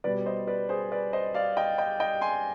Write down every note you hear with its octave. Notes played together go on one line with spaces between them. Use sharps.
B2 G3 B3 B4 D5
C5 D#5
B4 D5
G#4 C5
B4 D5
C5 D#5
D5 F5
D#5 G5
D#5 G5
D#5 G5
G#5 C6